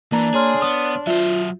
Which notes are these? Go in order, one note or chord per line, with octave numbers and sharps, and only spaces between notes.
E3 A#3 D4 A#5
G#4 C#5 C6 F6
B3 D#6
F#3 F4 C5 E5